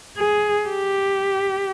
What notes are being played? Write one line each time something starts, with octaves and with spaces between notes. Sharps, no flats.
G#4
G4